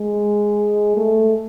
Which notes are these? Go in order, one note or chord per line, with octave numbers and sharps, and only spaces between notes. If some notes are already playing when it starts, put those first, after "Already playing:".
Already playing: G#3
A3